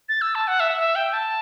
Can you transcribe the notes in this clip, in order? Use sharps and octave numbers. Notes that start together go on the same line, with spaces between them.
A6
E6
A5
F#5
E5
E5
G5
A5